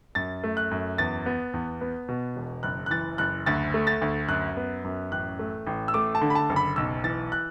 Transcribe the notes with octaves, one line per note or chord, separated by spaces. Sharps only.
F#2 A6
A3
F#6
F#2
E2 A6
B3
E2
B3
B2
E1
F#1 F#6
F#6
E3 A6
F#1 F#6
D2 A6
A3
A6
D2
F#2 F#6
B3
F#2
A1 F#6
A3
A1
E6
A3 D6
A5
D3
B5
A5
F#1
B5
B1 E6
E3 A6
F#6